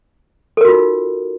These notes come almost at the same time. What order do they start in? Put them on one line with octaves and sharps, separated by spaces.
A4 A#4 F#4 F4 D#4